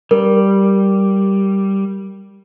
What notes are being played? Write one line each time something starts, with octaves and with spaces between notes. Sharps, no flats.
G3 A#4